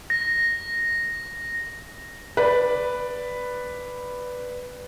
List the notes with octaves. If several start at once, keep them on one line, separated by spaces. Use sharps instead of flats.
A#6
B4 D5